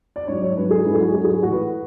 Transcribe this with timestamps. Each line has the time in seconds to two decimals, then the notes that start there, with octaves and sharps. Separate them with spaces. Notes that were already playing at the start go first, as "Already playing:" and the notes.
0.16 D5
0.28 G#2 F#3 C#5
0.42 C#5
0.56 G#2 F#3 B4
0.71 G#4
0.85 G#2 F#3 E4
0.95 G#4
1.00 F#4
1.14 G#2 F#3 G#4
1.25 G#4
1.28 F#4
1.43 A2 E3 F#4
1.52 B4